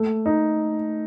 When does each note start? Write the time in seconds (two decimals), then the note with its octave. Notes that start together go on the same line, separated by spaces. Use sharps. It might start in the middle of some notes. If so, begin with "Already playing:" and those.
Already playing: A3
0.26 D#4